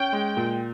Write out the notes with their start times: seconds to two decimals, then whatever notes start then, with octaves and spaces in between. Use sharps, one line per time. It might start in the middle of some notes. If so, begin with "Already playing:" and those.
Already playing: C#4 G5
0.13 G#3
0.37 A#2